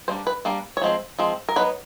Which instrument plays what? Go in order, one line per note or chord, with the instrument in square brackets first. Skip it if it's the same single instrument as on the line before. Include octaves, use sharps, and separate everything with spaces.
[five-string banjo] G3 A#3 D4 C5
B4
G3 A#3 D4
C#5
F3 G#3 C4
F3 G#3 C4
A#4
F#3 B3 D#4 B4